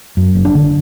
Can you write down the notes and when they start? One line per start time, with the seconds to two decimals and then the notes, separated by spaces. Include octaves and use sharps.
0.17 F#2
0.35 F#1
0.45 D4
0.55 D3